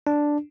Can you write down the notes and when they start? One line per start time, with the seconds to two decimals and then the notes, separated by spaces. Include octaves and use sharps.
0.07 D4